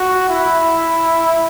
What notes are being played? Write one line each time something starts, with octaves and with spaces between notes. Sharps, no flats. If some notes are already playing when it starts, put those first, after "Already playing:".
Already playing: F#4
E4